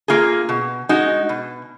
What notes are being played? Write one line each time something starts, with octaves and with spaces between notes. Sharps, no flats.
A#3 F4 G#4
B2
G#3 D#4 F#4
B2